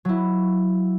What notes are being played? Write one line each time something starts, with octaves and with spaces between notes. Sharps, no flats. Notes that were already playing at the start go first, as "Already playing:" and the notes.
F#3 E4